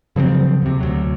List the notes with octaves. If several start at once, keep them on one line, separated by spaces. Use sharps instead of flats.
C#3 F3 F#3 C4
D#2 C3
D2 F#3